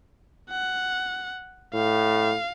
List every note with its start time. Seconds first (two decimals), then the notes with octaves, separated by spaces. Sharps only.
0.50 F#5
1.74 A2 F5